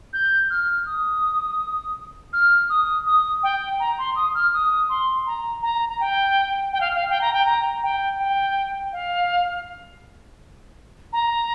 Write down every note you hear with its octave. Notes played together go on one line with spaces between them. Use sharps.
G6
F6
D#6
F6
D#6
D#6
G5
A#5
C6
D#6
F6
D#6
C6
A#5
A#5
A#5
G5
G5
F5
F5
G5
A#5
G5
A#5
G5
G5
F5
A#5